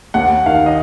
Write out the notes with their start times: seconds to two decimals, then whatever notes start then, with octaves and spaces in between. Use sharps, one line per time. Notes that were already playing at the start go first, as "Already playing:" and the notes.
0.14 D#2 F#5
0.46 D#3 F5
0.66 D#5